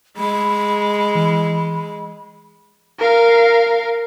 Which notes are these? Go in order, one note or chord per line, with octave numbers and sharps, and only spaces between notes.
G#3 B5
E3
A#4 F5